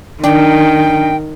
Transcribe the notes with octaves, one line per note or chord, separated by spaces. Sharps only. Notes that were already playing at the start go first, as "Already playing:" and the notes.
D#3 D4 G5